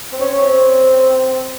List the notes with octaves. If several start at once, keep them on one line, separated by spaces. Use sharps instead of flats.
C4
C#4
C4